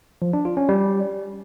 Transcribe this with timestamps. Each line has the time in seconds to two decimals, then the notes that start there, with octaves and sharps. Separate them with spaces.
0.22 F3
0.33 D4
0.45 F4
0.57 C#4
0.69 G3